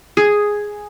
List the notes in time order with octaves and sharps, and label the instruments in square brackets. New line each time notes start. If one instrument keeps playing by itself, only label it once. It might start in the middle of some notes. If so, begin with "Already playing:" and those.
[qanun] G#4